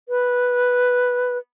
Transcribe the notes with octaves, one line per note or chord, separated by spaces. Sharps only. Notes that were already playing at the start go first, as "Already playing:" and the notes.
B4